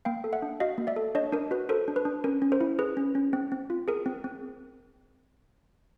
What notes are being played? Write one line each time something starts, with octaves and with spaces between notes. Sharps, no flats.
A#3 F5 G5
A4
E5 F#5
D4
F#4 D#5 F5
A#3
D5 E5
A4
D4 C#5 D#5
D4 A#4
F#4 B4
A4 A#4 C5
D4
B4
D4
C#4 A#4
C#4
A#4 C5
E4
G#4 B4
C#4
C#4
C4
C4
F4
G#4 A#4
C4
C4